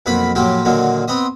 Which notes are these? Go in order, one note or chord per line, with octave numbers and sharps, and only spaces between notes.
B1 F2 A#3 B4 F#5 B5
A2 F3 F#3 A#3 G4 G5
A#2 D3 D#3 F#3 A#3
B3 C4 D#5 D#6